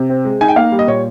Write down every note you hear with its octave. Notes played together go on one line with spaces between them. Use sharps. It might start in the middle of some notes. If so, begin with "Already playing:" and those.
Already playing: C3
C4
G#3
D#4 G#5
G5
A#3 F5
G3
D#5
A#2 C#5